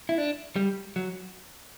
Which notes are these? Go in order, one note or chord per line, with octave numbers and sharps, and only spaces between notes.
E4
D4
G3
F#3